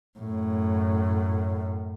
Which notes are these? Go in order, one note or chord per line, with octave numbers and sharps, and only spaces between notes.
F#2 A2